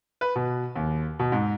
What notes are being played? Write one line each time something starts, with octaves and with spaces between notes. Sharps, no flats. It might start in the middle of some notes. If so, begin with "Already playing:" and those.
B4
B2
D#2
B2
G#2